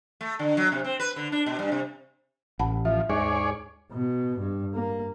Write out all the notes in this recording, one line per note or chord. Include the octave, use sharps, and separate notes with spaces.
A3
D3
F#3
C3
C4
B4
D3
D4
B2
G2
C3
A1 F#5 A5 B5
F3 E5
D#2 G#2 G#4 C#5 D5
B2
G2
A#3